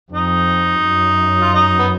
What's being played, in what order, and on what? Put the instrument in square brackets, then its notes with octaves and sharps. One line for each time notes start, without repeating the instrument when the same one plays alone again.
[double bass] F2 [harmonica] D#4
[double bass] F#2
[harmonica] F4
D#4
B3